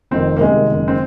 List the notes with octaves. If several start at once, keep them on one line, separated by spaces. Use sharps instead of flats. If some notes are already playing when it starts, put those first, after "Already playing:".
F1 F2 D#3 C4
A#3
C2 C3 D#3 G#3
F#1 F#2 D#3
C4